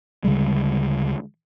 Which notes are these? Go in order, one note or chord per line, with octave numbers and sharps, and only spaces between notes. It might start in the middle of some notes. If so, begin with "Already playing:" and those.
D2 C#3 G3 G#3